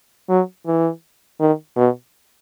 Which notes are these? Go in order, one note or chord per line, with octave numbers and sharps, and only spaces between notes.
F#3
E3
D#3
B2